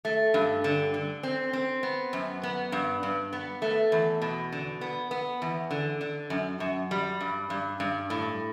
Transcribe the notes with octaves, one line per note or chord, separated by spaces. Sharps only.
A3
G2
D3
D3
C4
C4
B3
F#2
B3
G2
G2
B3
A3
E2
B2
D3
B3
B3
E2
D3
D3
F#2
F#2
G3
G2
G2
G2
A2